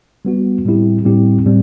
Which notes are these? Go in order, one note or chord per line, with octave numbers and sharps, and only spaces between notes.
G3 B3 F#4
A2 G3 C4 E4 G4
A2 G3 C4 E4 G4
A2 G3 C4